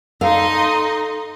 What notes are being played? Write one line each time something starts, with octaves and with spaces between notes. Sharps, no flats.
D#4 A4 D#5 F5 C6